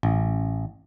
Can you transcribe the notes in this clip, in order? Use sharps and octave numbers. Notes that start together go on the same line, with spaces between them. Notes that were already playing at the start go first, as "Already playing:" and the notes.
A1